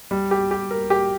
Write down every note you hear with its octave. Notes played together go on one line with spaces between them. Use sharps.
G3
G4
G4
A#4
G4